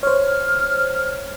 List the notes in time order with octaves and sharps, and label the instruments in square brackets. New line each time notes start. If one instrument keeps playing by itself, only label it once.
[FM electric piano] C5 C#5 [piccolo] F6